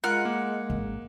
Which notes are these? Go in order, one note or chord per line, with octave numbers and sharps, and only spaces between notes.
G#3 F4 A#4 F#5 F6
A#3
G#1